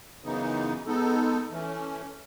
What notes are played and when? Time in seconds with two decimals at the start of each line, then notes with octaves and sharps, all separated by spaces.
0.23 F#2 C#3 E3 B3 D#4
0.86 G#3 B3 D#4 A4
1.50 E3 A3 C#4